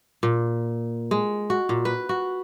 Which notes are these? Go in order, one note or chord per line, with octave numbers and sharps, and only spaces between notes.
A#2
G#3
F#4
A#2
B4
F#4